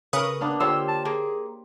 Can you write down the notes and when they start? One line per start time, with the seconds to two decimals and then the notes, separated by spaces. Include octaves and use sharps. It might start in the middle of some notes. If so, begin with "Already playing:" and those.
0.13 C#3 A#4 B4 C#6 D#6
0.41 A#3 B3 D4
0.60 D3 F4 G4 C5 C#5 E6
0.88 A5
1.05 A#3 G#4